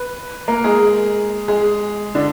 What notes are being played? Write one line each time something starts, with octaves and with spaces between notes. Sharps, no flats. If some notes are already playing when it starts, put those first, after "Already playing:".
Already playing: B4
A#3 A#4
G#3 G#4
G#3 G#4
D3 D4